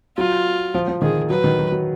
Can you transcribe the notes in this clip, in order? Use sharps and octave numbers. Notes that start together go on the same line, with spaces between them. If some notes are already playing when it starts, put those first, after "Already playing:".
F#3 F4
F3
F3
D#3 G#4
F#3 B4
D#3
F#3
F#3